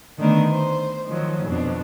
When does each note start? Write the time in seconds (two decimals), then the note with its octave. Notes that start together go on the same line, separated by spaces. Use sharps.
0.19 D3 D#3 A3 B3 D4 A#4
0.51 C5
1.08 D#3 F3 F#3
1.45 F2 B2 D4